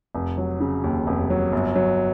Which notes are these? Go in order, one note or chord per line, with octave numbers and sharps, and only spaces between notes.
F1
F#3
C#3
D#2
F1
F#3
G1
F#3